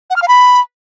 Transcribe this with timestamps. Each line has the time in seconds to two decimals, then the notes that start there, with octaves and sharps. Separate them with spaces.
0.10 F#5
0.16 F6
0.22 F5
0.28 B5